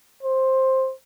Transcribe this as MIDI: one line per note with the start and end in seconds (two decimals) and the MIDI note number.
0.23 0.92 72